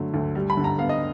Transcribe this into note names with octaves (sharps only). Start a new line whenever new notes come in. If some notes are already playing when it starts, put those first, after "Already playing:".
Already playing: D3 F#3 A3
D2
G3
B5
D3
A#5
B3 F5
D#5